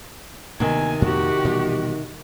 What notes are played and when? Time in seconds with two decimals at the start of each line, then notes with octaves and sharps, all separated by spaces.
0.60 D2 C3 D#3 A#3 B3 G#5
1.02 F2 A#2 F#4 G4
1.45 B2 E3 G3